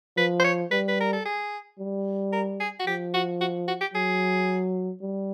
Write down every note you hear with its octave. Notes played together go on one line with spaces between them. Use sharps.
F3 B4
C5
C#5
G3 B4
B4
A#4
A4
G#4
G3
A#4
G#4
F#4
F3 G4
F#4
F#4
F#4
G4
F#3 G#4
G3